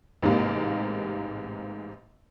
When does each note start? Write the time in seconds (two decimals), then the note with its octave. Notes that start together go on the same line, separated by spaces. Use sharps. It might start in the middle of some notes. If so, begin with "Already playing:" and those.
0.22 A1 G#2 C3 A#3